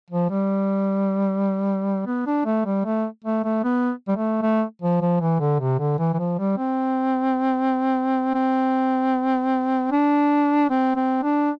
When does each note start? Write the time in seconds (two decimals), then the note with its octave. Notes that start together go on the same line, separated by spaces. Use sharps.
0.10 F3
0.30 G3
2.06 B3
2.27 D4
2.46 A3
2.66 G3
2.85 A3
3.24 A3
3.44 A3
3.64 B3
4.08 G3
4.16 A3
4.42 A3
4.81 F3
5.01 F3
5.21 E3
5.40 D3
5.60 C3
5.79 D3
5.99 E3
6.14 E3
6.19 F3
6.39 G3
6.58 C4
8.34 C4
9.91 D4
10.70 C4
10.96 C4
11.23 D4